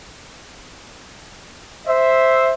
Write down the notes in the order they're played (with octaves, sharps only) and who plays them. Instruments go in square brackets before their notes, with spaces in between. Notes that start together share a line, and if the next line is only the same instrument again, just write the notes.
[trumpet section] C5 E5